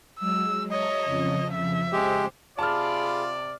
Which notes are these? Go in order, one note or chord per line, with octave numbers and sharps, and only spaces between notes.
F#3 G#3 E6
C#5 D#5 E5 A5 A#5
F2 C#3 F3
E5
G#3 G4 C5
C3 F4 G#4 D5 A5 B5 F6